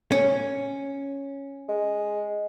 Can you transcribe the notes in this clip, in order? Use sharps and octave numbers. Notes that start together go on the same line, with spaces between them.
C#4
G#3